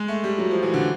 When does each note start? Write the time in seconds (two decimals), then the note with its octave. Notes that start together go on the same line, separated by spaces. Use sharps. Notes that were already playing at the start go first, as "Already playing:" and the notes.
Already playing: G#3
0.08 A3
0.24 G3
0.38 F#3
0.51 F3
0.63 E3
0.74 D3